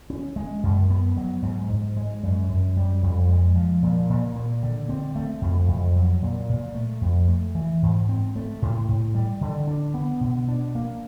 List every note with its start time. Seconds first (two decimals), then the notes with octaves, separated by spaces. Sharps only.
0.10 C#4
0.36 G#3
0.63 F#2
0.90 B3
1.17 F#3
1.42 G#2
1.70 G#2
1.97 G#3
2.23 F#2
2.49 F#2
2.77 G3
3.03 F2
3.29 G#3
3.55 F3
3.82 A#2
4.10 A#2
4.36 A#3
4.63 D3
4.89 C4
5.16 A3
5.42 F2
5.68 F2
5.96 F#3
6.22 A#2
6.49 A#2
6.75 A3
7.01 F2
7.28 A3
7.55 E3
7.82 G#2
8.09 C4
8.36 A3
8.62 A2
8.89 A2
9.15 G3
9.41 D3
9.67 D4
9.94 B3
10.21 B2
10.48 D4
10.75 A#3